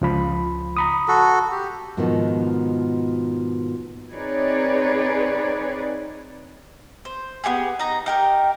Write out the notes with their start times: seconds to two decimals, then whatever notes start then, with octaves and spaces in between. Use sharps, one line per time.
0.01 C#2 F3 B5
0.77 A#5 B5 D#6
1.08 F#4 A4
1.52 G4
1.97 G#2 B2 D#3 F3 B3 D#4
4.12 C4 D#4 G#4 B4 C#5 D5
7.05 C5
7.44 B3 D#4 G4 G#4
7.79 D#4 D#5 A#5
8.06 D#4 G4 A#4